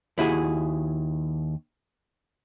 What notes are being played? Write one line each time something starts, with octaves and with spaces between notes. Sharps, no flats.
D#2 E4 F#4 G#4